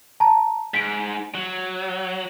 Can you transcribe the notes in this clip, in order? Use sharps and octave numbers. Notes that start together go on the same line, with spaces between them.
A5 A#5
G#2 B6 D7
F#3